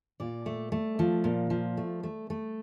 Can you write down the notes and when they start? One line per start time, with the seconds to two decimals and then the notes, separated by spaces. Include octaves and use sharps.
0.20 A#2 D5
0.46 A3
0.72 A3
0.99 F3
1.24 A#2
1.50 F3
1.77 A3
2.03 A3
2.30 A3